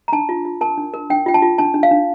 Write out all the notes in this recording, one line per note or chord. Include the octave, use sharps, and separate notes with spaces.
A#5
D4 A5
F4
F4
A#4 A5
D4
A#4
D4 G5
F4 G5
A5
F4
D4 A5
D4
F5
D4